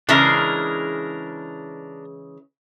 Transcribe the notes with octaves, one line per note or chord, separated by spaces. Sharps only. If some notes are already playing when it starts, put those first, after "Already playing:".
C#3 E3 G#3 D4 A#4